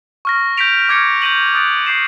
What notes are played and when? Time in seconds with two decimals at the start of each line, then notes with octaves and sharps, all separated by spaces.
0.25 C#6 F6 A#6
0.57 G6 B6 D7 F7
0.89 D6 F6 G#6 C#7
1.22 G6 A#6 D#7 F#7
1.55 D#6 F#6 A6 D7
1.86 D6 G6 C7 E7